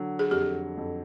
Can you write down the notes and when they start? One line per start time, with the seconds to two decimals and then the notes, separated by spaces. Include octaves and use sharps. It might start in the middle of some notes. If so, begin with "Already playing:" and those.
Already playing: D3 F#3
0.19 G#4
0.31 F2 G4
0.77 F2